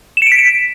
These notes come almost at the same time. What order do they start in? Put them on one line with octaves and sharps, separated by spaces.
E7 C#7 D7 B6